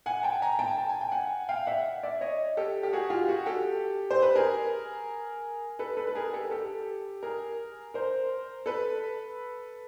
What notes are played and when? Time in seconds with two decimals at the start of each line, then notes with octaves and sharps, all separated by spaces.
0.06 F#5 G#5
0.23 G5 A5
0.42 G#5 A#5
0.59 G5 A5
0.77 A5
0.89 G#5
1.01 G5
1.11 F#5 G#5
1.49 F5 G5
1.67 E5 F#5
2.03 D5 E5
2.21 C#5 D#5
2.57 G4 A4
2.83 G4
2.93 F#4 G#4
3.10 F4 G4
3.28 F#4 G#4
3.46 G4 A4
4.11 C5
4.22 B4
4.35 G#4 A#4
5.79 A4 B4
5.97 A4 B4
6.07 B4
6.15 G#4 A#4
6.33 G4 A4
6.51 G4 A4
7.23 G#4 A#4
7.94 A#4 C5
8.66 A4 B4